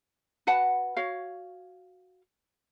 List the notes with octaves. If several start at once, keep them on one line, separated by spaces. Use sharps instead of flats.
F#4 B4 F#5 A5
F#4 C#5 F5